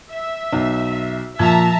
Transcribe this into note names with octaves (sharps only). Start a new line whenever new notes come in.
E5
B1
A#2 F3 E5 A5 A#5